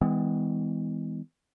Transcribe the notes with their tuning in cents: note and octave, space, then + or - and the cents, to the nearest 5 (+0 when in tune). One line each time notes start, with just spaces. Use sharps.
E3 -40 G#3 -25 B3 +35